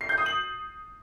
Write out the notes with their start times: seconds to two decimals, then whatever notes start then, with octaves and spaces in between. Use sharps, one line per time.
0.01 C7
0.09 G6
0.18 D#6
0.26 F#7